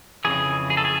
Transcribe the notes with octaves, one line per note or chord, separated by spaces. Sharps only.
F2 C#3 E3 G#4
G#4
A4
G#4